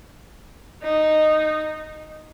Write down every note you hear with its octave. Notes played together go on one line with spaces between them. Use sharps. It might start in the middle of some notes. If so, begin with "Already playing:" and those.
D#4